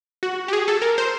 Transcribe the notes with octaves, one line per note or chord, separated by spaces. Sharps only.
F#4
G4
G#4
A4
A#4
C5